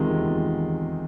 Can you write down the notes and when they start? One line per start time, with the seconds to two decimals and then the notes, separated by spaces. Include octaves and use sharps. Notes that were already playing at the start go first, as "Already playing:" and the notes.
Already playing: E2 C3 D#3 G#3 F4
0.17 E2